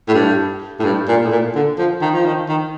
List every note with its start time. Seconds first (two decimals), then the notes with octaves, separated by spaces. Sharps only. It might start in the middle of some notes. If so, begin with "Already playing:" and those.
0.08 A2
0.14 G2
0.80 A2
0.84 G2
1.08 A#2
1.24 A2
1.31 A#2
1.55 D3
1.78 F3
2.02 D#3
2.14 F3
2.25 D#3
2.49 D#3